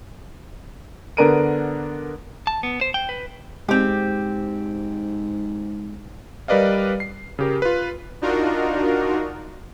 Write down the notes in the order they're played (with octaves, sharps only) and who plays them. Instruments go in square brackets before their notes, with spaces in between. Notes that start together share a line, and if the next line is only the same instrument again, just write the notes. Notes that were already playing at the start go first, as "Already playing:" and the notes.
[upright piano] D3 B3 D4 A#4 D7 D#7
[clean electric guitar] A5
B3
C5
G5
B4
[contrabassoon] G#2 [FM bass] G#3 [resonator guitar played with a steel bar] C4 G4
[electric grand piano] G3 A#4 B4 D5 D#5 F5
C7
C#3 G4 A#4
F4 B4
[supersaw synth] D4 D#4 F4 F#4 A#4